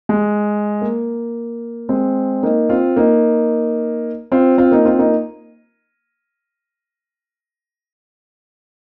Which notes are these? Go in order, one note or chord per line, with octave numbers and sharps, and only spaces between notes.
G#3
A#3
G#3 C4
A#3 D#4
C4 F4
A#3 D#4
C4 F4
C4 F4
A#3 D#4
C4 F4
A#3 D#4